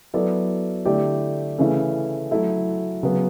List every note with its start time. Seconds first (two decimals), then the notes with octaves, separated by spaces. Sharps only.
0.14 F#3 B3 E4 A4 D5
0.85 D3 A3 E4 G4 D5
1.59 C#3 E3 A3 C#4 E4
2.31 F#3 A3 E4 A4
3.03 C#3 F#3 B3